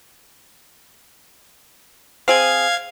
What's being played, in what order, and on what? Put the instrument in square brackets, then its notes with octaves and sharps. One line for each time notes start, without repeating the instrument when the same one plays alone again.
[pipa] C4 G#4 [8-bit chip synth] F5 G#6